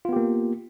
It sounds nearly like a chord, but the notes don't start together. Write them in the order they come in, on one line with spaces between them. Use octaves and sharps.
F4 B3 G4 A#3